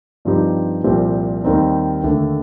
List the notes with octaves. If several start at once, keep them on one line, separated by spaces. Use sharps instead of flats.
G2 F3 C4 D#4 G4
C2 A#2 F3 C4 G4
D#2 D#3 G3 C4 D#4
D#2 D3 A3 D4